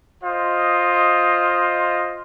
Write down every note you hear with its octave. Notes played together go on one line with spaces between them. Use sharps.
F4 C5 D#5